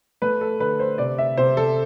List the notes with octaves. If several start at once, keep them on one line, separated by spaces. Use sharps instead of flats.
A3 B4
A4
D3 B4
C5
C3 D5
E5
C3 C5
A4